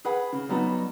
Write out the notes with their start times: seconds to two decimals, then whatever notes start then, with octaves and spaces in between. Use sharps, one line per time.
0.05 G#4 B4 F#5 B5
0.33 C#3
0.49 F#3 G3 B3 D#4 F#4